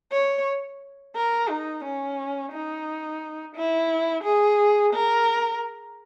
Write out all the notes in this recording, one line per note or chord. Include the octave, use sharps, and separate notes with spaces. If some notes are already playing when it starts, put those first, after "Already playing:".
C#5
A#4
D#4
C#4
D#4
E4
G#4
A#4